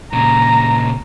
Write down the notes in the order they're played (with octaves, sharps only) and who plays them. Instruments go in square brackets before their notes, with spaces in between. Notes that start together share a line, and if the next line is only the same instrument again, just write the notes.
[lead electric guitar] A#2 C#3 [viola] A#5